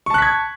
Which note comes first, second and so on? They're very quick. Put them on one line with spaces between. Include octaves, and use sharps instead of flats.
C#6 A5 F#6 B6 G#6